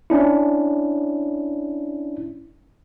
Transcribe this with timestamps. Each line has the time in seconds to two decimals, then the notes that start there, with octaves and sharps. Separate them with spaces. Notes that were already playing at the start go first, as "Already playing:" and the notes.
0.10 C#4 D4 E4